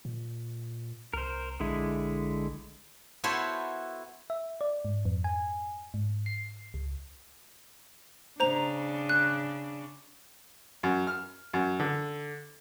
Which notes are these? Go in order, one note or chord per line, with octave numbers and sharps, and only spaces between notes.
A#2
C2 A#4 C5
A#1 D3 G#3 E4
B3 E4 F#4 A4 C5 C#5
E5
D5
G#2
F2
G#5
G#2
C7
C#2
C#3 D4 C5 A#5 F7
F#6
F#2
F6
F#2
D3